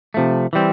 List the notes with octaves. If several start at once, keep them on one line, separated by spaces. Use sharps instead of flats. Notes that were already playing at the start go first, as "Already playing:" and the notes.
C3 F3 A3
E3 G3 C4